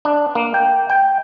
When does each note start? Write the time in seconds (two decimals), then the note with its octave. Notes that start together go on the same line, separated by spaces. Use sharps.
0.05 D4
0.35 A#3
0.54 G5
0.90 G5